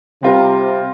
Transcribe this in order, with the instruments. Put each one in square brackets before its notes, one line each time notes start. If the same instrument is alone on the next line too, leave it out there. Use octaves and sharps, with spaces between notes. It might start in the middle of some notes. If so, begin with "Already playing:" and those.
[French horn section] C3 [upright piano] G3 C4 F4 A#4